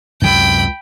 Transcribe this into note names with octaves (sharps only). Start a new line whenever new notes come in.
C#2 F#2 C3 G5 B5